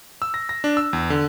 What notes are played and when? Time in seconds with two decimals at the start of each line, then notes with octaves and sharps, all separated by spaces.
0.22 E6
0.34 A#6
0.49 A#6
0.64 D4
0.77 E6
0.93 E2
1.10 D3